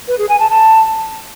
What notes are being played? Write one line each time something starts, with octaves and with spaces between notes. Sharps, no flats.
B4
G#4
G#5
A5
A5